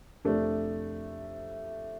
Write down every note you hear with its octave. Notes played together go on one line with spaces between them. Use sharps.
F2 C3 A3 D4